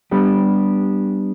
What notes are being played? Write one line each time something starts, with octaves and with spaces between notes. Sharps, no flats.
G3 B3 D4 G4